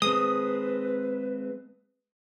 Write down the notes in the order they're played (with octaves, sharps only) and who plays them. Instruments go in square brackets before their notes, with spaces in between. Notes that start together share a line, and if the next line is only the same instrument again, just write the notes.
[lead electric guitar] G#3 C4 [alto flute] B4 [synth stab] D#6